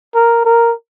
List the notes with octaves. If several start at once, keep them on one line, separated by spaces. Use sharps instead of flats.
A#4
A#4